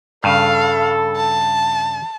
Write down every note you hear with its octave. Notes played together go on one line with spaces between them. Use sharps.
G2 C#3 A4 F5
A5